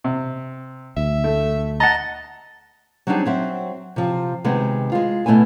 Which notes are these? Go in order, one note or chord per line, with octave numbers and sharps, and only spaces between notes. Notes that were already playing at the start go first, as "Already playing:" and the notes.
C3
D2 E5
A3
D#5 F#5 A5 A#5 A6
F#3 G3 C4 D4 D#4 G#4
F#3 C4 E5
C3 F3
C3 D#3 G#3 B3
G#3 F4
B2 A3 B3 E4 G#5